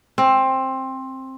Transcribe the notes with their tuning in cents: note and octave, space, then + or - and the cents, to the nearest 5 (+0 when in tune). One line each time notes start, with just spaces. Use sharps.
C4 +15